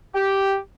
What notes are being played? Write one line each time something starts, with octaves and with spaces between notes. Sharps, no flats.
G4